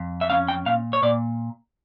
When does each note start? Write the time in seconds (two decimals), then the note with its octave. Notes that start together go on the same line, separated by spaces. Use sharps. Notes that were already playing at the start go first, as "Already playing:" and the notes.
Already playing: F2
0.21 E5
0.30 C#4 F5
0.48 G5
0.66 A#2 F5
0.93 C#5
1.02 A#2 D5